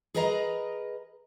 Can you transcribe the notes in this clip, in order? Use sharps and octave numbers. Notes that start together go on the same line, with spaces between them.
G#4 A#4 B4 D#5 E5 A#5